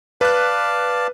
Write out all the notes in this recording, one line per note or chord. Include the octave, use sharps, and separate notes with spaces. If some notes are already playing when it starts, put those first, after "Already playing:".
B4 D5 F5 A5 F#6